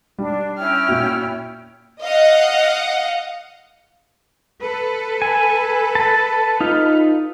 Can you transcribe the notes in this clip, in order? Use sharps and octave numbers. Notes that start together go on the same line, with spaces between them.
G3 D4
C#4 E4 G5 F6
A#2 F#4
D#5 F5 F#5
A4 B4
G#5
A5
D#4 F4